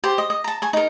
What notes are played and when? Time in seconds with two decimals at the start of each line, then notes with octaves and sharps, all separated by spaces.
0.04 G4 C5
0.18 D#5
0.30 D#5
0.44 A5 A#5
0.62 G#5 C#6
0.73 D#4 A#4